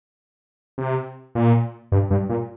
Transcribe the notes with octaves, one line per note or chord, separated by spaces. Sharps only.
C3
A#2
G2
G2
A#2